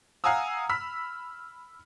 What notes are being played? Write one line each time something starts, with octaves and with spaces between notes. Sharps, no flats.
F5 F#5 G#5 A#5 D#6 E6
B5 E6 F6 B6